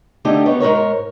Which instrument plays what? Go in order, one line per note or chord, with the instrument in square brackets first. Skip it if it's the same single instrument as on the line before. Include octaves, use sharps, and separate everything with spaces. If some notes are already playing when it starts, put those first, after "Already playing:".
[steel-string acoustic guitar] D3 A3 D4 D#4 G4
B3 D#4 C#5
G#2 C3 A#4 C#5